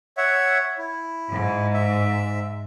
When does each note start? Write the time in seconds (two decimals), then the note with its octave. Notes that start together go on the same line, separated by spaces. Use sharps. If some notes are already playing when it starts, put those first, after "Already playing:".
0.17 C#5 E5 F#5
0.78 E4
1.31 G#2
1.74 E5